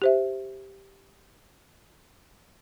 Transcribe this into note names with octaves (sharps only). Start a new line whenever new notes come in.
G4 C5 E5